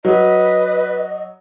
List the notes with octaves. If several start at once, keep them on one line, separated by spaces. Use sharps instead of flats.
F#3 B4 D#5